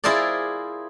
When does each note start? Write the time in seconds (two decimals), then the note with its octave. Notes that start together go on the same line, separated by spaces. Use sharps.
0.04 E4 F4 G#4 A#4 C5 D5